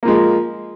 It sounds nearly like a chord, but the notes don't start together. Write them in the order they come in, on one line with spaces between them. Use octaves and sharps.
A#3 F3 G#3